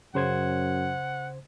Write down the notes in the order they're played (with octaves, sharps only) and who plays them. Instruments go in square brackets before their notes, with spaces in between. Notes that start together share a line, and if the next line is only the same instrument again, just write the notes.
[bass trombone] F#2 [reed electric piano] C#3 C5 G#6 [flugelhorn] F#5